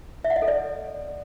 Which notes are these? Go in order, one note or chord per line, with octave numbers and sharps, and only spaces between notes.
E5
F#5
D#5
A4
D5